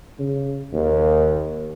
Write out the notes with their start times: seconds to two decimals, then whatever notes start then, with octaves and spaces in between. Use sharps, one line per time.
0.19 C#3
0.73 D#2